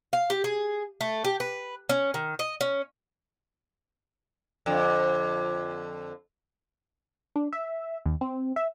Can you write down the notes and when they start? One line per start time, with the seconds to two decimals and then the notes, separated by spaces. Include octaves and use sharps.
0.13 F5
0.30 G4
0.44 G#4
1.01 A3
1.25 G4
1.40 B4
1.89 C#4
2.14 D#3
2.39 D#5
2.61 C#4
4.66 F2 D3
7.36 D4
7.53 E5
8.06 D#2
8.21 C4
8.56 E5